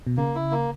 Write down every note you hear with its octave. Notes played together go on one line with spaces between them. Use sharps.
B2
C#3 A#3
E4
A#3